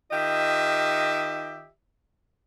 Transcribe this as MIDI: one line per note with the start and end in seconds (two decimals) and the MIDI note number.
0.11 1.68 51
0.11 1.68 65
0.11 1.68 67
0.11 1.68 75
0.11 1.68 76